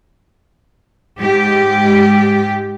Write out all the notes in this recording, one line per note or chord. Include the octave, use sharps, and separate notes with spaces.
G#2 G4